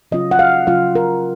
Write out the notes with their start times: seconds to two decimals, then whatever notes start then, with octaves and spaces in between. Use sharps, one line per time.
0.12 C#3 F#3 C#4 F4 D#5
0.31 F#5
0.39 F5
0.67 C#3 F#3 C#4 F4 F5
0.95 A#4